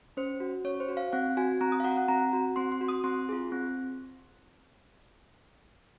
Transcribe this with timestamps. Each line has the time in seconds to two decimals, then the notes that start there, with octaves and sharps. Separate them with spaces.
0.17 C#4 C5
0.40 F#4
0.64 C#4 C#5
0.80 C5
0.88 F#4
0.97 F5
1.13 C4 F#5
1.37 F#4 G#5
1.61 C4 A#5
1.72 D#6
1.80 F5
1.84 F#4 F#5
1.97 F#5
2.08 C4 A#5
2.33 F#4
2.56 C4 C6
2.72 C6
2.81 F#4
2.88 D#6
3.04 C4 C6
3.29 F4 G#4
3.52 C4